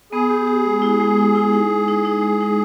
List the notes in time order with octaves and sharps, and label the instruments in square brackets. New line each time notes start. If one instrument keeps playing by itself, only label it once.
[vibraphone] B3 [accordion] G#4
[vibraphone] G4
G4
G#3
E4
G#3
E4
E4
D#4
G#3
D#4
D#4
G#3
D#4